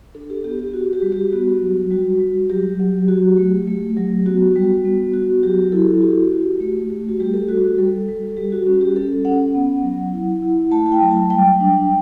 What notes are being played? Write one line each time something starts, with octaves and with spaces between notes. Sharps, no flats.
D4 A4
G4
B3 G4
G4
F#4
G4
G3
G4
B3 F#4
F#3
G3 F#4
G3
F#3 G4
F#3
F#4
A3
A3
F#3
B3 F#4
G3
B3
F#4
F#3 G4
E4 A4
F#4 G4
F#4
A3
A3
F#4
G3 G4
A4
G3 F#4
F#4
G3 A4
G3
G3 G4
F#4
C#4 F#4
G4
C#4 A4
C#4 F#5
B3
F#3
E4
E4
A3 A5
A5
G5
F#3
A5
G3 G5
D4